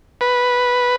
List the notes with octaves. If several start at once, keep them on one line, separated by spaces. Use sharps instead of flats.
B4